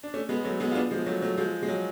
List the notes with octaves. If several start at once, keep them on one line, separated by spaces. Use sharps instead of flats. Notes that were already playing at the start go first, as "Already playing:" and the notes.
D4
A3 C#4
G#3 B3
F#3 A3
G#3 B3
F4
B3 D4
F3 G#3
F#3 A3
F#3 A3
F3 G#3
G#3
F#3